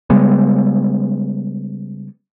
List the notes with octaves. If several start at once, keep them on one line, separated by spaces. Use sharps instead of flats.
C#3 G3 G#3 B3